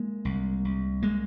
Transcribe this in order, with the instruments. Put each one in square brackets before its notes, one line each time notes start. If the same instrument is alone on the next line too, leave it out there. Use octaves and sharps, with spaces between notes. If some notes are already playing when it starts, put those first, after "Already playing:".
Already playing: [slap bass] G#3 A#3
C2
C2
G#3 A#3